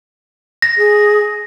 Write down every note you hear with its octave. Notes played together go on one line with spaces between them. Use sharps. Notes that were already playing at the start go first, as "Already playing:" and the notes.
A#6
G#4